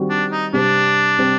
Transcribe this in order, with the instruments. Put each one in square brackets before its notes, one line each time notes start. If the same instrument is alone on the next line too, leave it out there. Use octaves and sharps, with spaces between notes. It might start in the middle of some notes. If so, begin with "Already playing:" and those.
Already playing: [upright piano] D#3 G3 C4 F#4
[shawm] D4
D#4
[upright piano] C3 G3 C4 [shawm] D4
[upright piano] C3 G3 C4